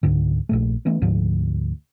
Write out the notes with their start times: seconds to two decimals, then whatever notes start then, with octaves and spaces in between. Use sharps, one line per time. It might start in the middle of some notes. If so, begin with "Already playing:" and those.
0.03 C#2 G#2 D3
0.49 A#1 A#2 A3
0.85 E3 A3 B3 C#4
1.02 D2 G#2 F3